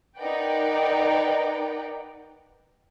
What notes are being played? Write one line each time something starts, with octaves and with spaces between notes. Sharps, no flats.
D#4 A#4 B4 D5 F#5 G5